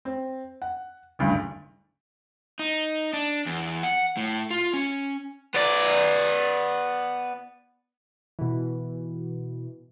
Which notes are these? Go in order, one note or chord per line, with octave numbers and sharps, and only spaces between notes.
C4
F#5
F#1 D2 G2
D#4
D4
E2
F#5
A2
F4
C#4
B3 D5
B2 E3